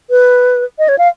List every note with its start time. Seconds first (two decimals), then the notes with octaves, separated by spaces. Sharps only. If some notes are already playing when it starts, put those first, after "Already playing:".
0.10 B4
0.79 D#5
0.89 C#5
0.98 F5